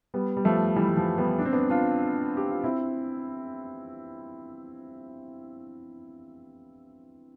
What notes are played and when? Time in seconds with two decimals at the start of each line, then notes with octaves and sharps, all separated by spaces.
0.14 G3 B3
0.37 G3
0.45 F3 A3
0.76 E3 G3
0.89 G3
0.97 F3
1.18 G3 B3
1.39 D4
1.45 C4
1.53 B3 D4
1.70 D4 F4
2.37 G4
2.50 F4
2.64 C4 E4